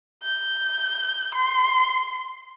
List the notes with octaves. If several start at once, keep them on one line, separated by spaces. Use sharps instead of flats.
G6
C6